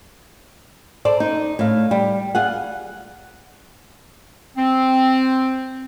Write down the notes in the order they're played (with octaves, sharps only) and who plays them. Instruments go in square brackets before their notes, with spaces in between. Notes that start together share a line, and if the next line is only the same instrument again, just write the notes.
[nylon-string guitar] A4 C5 D5
D#4
A2 F5
G3
F4 G#4 F#5
[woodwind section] C4